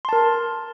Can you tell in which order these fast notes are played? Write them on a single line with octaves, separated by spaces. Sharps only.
C6 A5 A#4